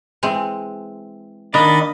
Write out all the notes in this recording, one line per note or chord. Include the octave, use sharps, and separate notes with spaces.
E3 G#3 C4
D#3 A#3 D4 D5 D#5 B5